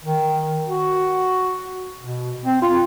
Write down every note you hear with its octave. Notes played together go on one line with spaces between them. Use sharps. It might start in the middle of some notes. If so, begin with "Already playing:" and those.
D#3
F#4
B2
C4
F4